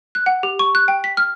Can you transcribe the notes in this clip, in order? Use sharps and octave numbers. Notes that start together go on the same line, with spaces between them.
F#6
F#5
G4
C#6
F#6
G5
B6
F6